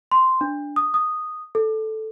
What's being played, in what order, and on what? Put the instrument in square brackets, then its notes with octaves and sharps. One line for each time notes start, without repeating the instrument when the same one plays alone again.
[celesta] C6
D4
D#6
D#6
A4